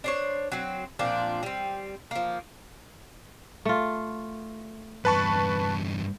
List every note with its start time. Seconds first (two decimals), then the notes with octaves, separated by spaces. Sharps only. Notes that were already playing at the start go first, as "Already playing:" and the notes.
0.04 D4 C5 C#5
0.52 F#3 C4
0.99 A#2 F3 C4 D4
1.43 G3 C4
2.11 F3 A#3
3.65 A3 F4
5.05 E2 G2 B4 A5 C#6